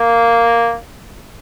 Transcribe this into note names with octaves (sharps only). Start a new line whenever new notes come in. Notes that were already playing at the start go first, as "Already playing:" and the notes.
Already playing: A#3